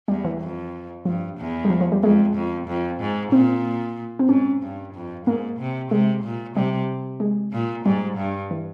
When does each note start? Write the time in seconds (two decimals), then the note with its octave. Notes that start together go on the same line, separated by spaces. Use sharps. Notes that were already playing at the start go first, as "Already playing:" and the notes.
0.08 E2 G3
0.25 E3
0.41 F2
1.05 G2 F3
1.38 E2
1.65 G3
1.70 F3
1.81 F3
1.92 G3
2.03 F2 G#3
2.35 F2
2.68 F2
3.00 G#2
3.32 A#2 C4
4.19 C4
4.29 G#2 C#4
4.62 G2
4.94 F2
5.26 G#2 A#3
5.59 C3
5.91 C3 G#3
6.24 A#2
6.56 C3 G3
7.20 G#3
7.53 A#2
7.86 G#2 G3
8.17 G2
8.51 E3